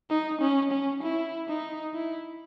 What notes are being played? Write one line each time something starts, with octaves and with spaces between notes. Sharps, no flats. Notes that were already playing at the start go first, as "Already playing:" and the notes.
D#4
C#4
C#4
E4
D#4
E4